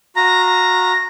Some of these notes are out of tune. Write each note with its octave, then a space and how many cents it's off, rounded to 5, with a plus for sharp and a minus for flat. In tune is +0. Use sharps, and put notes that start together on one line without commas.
F#4 -25 F5 -10 A#5 +0